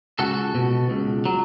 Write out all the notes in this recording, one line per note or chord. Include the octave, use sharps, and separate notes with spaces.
C#2 F#4 A4
B2
C#2
F#3